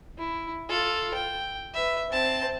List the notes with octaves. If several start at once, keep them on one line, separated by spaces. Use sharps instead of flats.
E4
F4 A4
G5
B4 E5
C4 A5